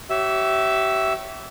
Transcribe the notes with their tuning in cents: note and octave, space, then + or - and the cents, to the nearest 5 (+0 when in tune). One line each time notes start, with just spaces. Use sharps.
G4 -35 C#5 +0 E5 +0